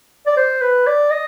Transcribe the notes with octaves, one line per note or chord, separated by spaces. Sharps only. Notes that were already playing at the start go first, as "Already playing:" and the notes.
D5
C5
B4
D5
D#5